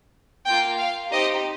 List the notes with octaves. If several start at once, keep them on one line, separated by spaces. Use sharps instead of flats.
A#3 F4 G5
F5
C4 D#4 G4 D#5